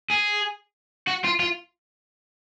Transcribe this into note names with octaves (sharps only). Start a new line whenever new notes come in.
G#4
F#4
F4
F4